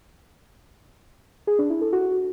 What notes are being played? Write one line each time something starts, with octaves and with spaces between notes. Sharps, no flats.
G#4
D4
E4
A4
F#4